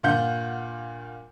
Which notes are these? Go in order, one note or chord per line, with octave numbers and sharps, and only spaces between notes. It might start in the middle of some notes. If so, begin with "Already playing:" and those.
G2 A#2 F4 F#5 G6